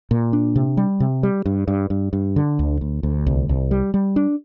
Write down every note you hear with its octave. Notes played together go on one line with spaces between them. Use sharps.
A#2
D4
C3
G3
C3
G3
G2
G2
G2
G2
D3
D2
D2
D2
C2
C2
G3
G3
D4